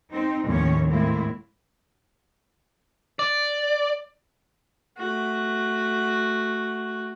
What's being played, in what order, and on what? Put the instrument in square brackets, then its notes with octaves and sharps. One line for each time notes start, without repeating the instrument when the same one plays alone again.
[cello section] C4 D#4
D#2 A2 F3 C#4 C#5
A2 G#3 A#3 C4 E4
[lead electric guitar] D5
[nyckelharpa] A3 F#4